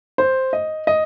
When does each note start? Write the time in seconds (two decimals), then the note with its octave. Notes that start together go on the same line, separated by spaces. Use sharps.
0.18 C5
0.53 D#5
0.87 D#5